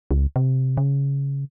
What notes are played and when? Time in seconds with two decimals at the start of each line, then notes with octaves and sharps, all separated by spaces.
0.11 C#2
0.36 C3
0.77 C#3